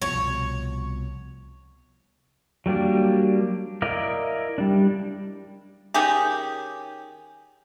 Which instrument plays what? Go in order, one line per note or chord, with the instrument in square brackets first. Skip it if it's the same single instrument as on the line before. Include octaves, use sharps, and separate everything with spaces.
[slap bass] C2 B2 F3 [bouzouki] C#5
[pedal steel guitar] F#3 G3 A#3 D4
E4 A#4 D5 D#5 F5
G3 D4
[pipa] D#3 C#4 G4 G#4